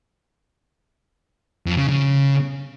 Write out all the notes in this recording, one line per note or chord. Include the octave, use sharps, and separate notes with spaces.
F2
C#3
C#3